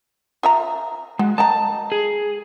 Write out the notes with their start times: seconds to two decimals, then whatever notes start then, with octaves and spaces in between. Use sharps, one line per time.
0.43 F4 E5 A#5
1.19 G#3 F#4
1.38 D#5 G5 A5 A#5
1.92 G#4